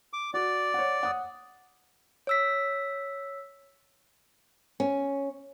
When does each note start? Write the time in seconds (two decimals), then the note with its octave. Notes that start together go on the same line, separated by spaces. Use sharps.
0.13 D6
0.34 F#4 D5
0.74 C#5 F#5
1.03 F#5 D#6
2.27 C#5 E6 B6
4.80 C#4